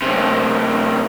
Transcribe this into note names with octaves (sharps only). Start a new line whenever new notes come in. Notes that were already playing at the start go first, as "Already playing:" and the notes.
F#2 C3